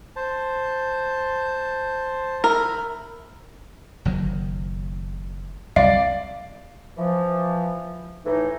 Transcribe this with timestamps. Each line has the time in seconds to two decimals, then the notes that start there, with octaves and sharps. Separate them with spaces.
0.16 C5 A5
2.44 A#4 E5 B5
4.05 F#1 D#3 F#3
5.76 C2 F#2 C3 D5 F5
6.97 E3 F3
8.25 A2 E3 D#4